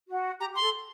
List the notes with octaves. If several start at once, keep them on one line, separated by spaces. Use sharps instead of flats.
F#4
G4 A#5
G4
C6
A4